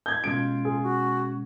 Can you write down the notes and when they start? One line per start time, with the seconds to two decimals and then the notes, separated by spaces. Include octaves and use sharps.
0.06 G6 G#6
0.24 B2 G#3 C#4 F4 G#6 D7
0.65 G#4
0.83 F#4